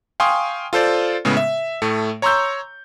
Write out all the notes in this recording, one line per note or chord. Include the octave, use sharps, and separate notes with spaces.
F5 G5 G#5 C6 C#6 D#6
F4 A4 C5 D5
A2 C#3 G#3 B3
E5
A2 A3
C#5 A#5 C6 C#6 E6 G6